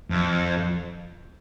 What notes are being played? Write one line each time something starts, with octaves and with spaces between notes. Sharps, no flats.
F2